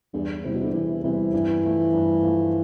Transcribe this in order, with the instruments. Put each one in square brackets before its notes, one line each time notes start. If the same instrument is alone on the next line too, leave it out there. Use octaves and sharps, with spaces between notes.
[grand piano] E2 [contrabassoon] G2
[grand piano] C3 G3 C4 E4
[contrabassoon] B2
D3
[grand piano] E2 [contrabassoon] E3
[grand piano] C3 G3 C4 E4 [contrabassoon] E3
[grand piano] G2 [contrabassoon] E3
[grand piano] F3 A3
G2
F3 A3